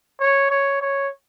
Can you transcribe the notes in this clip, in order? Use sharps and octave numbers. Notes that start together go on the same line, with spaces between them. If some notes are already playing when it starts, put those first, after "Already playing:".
C#5
C#5
C#5